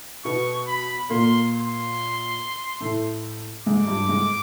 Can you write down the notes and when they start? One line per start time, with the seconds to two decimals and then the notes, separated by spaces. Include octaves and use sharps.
0.25 B2 B3 C#6
0.68 B5
1.10 A#2 A#3 C6
1.53 C6
2.81 A2 A3
3.66 G#2 G#3 D6
3.87 G2 G3
4.09 G#2 G#3